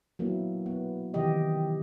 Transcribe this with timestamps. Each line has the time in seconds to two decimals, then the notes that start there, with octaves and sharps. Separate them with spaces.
0.19 F#3 A#3 B3 E4
0.66 B3
1.14 C3 D#3 E3 G4 D#5